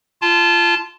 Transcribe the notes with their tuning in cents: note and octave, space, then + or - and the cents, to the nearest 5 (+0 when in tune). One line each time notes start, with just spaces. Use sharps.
F4 -20 A5 +0